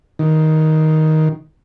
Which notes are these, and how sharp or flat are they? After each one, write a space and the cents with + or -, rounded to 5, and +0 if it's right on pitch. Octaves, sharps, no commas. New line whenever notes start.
D#3 +10